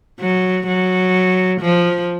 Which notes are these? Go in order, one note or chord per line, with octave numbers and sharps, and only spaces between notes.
F#3
F#3
F3